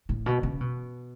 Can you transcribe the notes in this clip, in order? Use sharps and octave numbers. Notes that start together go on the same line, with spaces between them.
A2
B2
C#3
B2